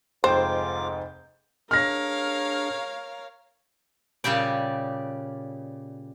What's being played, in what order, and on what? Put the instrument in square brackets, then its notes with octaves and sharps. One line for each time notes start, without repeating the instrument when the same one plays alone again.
[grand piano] F1 G5 G6 [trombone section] G#2 [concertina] F4 D6 [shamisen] C5
[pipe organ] D4 G#4 [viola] A#4 C#5 [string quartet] F5 [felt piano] F6 A#6
[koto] A#2 C#3 G3 G4 D5